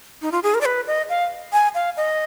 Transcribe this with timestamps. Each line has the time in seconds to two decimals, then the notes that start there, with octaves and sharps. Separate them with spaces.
0.22 D#4
0.32 F4
0.43 G#4
0.54 A#4
0.61 D5
0.65 B4
0.87 D#5
1.09 F5
1.53 G#5
1.75 F5
1.97 D#5